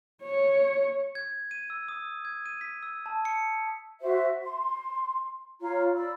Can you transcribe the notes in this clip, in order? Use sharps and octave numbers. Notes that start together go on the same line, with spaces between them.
C#5
G#6
D#7
E6
D#6
G#6
D#7
B6
E6
A5
C#7
F#4 C5 E5
C6
F4 C#5 A#5
D5 B5 E6